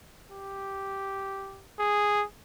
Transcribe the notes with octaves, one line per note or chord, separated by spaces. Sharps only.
G4
G#4